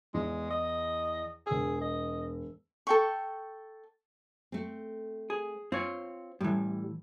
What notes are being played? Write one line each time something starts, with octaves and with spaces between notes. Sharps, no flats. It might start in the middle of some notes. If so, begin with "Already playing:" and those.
E2 G#3
D#5
E1 G#4 E6
D#5
A4 G5 C#6
A3 C4
G#4
C4 F4 C#5
A2 E3 G3